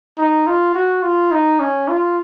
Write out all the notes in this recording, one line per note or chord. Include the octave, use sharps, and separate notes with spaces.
D#4
F4
F#4
F4
D#4
C#4
F4